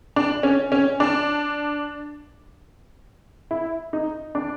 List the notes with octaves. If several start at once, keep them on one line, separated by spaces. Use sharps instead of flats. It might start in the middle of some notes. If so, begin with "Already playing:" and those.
D4
C#4
C#4
D4
E4
D#4
D4